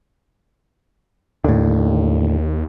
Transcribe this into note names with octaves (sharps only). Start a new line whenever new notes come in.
D#2 A2 D3